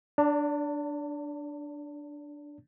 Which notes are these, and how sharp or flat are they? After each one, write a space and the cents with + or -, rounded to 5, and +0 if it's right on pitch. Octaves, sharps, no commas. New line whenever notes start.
D4 +0 D5 -35 A5 +35